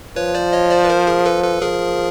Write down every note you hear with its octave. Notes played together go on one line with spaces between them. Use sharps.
F3 B4 C#5
C5 D5
C#5 D#5
C5 D5
B4
A#4 C5
G#4 A#4
A4 B4
A4 B4
F3 G#4 A#4